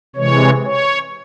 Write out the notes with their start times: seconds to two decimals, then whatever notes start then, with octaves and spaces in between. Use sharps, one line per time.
0.16 C3 E3 G#3 C#5
0.64 C#5